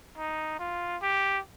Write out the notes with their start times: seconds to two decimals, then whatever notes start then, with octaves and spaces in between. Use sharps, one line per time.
0.17 D#4
0.59 F4
1.02 G4